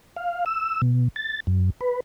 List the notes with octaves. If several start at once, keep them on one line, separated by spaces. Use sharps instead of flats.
F5
E6
B2
A6
F#2
B4